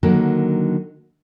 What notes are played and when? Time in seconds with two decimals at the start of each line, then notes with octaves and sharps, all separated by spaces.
0.03 D3 D#3 F#3 A#3